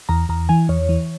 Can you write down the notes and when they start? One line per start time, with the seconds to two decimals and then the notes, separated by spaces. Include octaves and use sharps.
0.09 E2 A#5
0.29 E2 A#5
0.49 E3 G#5
0.69 E2 C#5
0.89 E3